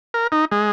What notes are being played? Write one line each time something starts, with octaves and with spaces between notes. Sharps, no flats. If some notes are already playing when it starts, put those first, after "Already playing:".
A#4
D#4
G#3